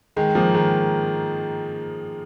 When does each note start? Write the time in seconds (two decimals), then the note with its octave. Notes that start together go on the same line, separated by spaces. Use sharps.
0.17 D#3 G#3
0.35 F3 A#3
0.54 D#3 G#3